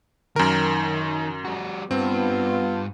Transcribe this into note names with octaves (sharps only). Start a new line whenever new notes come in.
F#2 D#3 A#4
G3 F#4
G2 B3 C4 F4